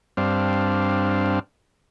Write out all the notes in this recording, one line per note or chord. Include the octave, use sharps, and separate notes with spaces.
G2 C4 D4 F5